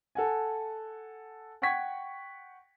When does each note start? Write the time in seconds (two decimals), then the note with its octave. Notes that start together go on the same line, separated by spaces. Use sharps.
0.15 A4 F#5 G#5
1.62 F#5 G5 C#6 G#6 B6